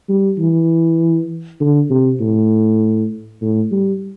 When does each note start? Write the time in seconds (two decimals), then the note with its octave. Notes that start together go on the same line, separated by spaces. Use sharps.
0.09 G3
0.39 E3
1.60 D3
1.90 C3
2.20 A2
3.42 A2
3.71 G3